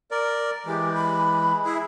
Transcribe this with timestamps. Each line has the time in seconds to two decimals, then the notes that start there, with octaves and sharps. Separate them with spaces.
0.11 A#4 D5
0.66 E3 G#3 G4
0.94 B5
1.65 E4 G#4 E5